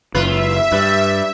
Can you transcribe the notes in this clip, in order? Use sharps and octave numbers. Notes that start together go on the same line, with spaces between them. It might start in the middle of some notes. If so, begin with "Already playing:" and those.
F#1 G#2 F4 B4 E5
G2 G3 B4